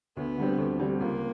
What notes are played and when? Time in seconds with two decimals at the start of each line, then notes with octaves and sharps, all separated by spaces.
0.17 D2 B3
0.38 D3 G3 C4
0.58 D2
0.80 D3 G3 C4
1.00 C#2 A#3